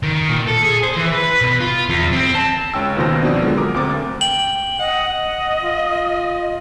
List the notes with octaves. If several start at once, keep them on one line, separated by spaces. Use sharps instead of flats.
D#3
A#2
A4
G#4
C5
E3
B4
B2
F4
E2
C4
A5
C#2 C#4 G5 E6
D#2 B2 D#3 F4 C5 A#6
B2 F3 C4 D4
D3 F#3 G#3
A#4 D6 D#6
D2 C4 D6 A6
G5 F#7
D#5 F#5
F4